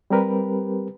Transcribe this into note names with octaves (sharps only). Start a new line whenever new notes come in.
G3 C4 G4 A#4 B4